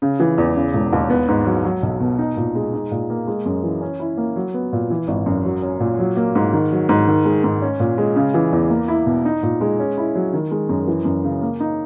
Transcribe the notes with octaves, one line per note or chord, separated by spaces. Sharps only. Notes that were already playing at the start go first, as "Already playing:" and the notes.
C#3
E3
E2
C#3
E1
D#2
B3
G#2
F#3
F#3
B1
B2
D#4
A#2
G#3
D#4
A#2
A#3
G#3
F#2
E3
C#4
E4
A#3
F#3
B3
A#2
E3
G#1
F#2
F#3
C#4
A#2
F#3
A#3
G#2
D#3
F#3
G#2
D#3
G#3
G#2
C#4
A#2
G#3
C#3
E3
E2
A#3
E4
B2
D#4
A#2
G#3
C#4
E4
F#3
D#3
G#3
F#2
E3
F#2
C#3
A#3
D#4